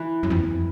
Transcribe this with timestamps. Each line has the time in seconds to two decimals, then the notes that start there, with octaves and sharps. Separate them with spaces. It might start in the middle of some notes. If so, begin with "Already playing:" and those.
Already playing: E3
0.23 F#2
0.30 F2
0.38 E2
0.46 F2